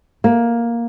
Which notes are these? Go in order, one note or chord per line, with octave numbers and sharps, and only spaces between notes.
A#3